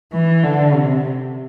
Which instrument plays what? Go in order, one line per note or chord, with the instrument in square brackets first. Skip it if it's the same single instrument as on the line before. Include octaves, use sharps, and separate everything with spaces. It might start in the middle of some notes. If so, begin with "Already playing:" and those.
[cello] E3
D3
C3